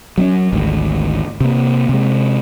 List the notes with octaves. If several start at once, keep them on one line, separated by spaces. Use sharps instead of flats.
F#3 C4 C#4
G#1 D2
C3 A#3
C3 G#3